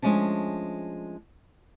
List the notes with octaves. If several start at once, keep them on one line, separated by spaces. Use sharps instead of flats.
F3 G#3 A3 C#4 D4